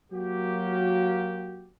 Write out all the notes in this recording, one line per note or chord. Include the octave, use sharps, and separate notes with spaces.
F#3 A#3 F#4 G4